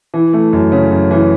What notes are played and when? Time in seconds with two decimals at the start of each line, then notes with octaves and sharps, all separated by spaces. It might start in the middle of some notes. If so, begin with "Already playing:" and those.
0.14 E3
0.33 A3
0.53 F#2
0.72 C#3
0.91 F#2
1.11 E3